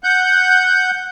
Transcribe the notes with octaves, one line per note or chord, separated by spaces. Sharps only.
F#5 G6